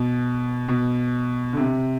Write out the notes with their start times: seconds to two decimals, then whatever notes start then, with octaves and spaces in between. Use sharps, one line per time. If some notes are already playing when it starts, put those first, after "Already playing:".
Already playing: B2
0.69 B2
1.53 D3
1.57 C3